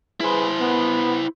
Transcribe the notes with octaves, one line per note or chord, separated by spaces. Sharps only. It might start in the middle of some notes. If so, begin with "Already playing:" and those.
E4 G#4 B4 C5
B3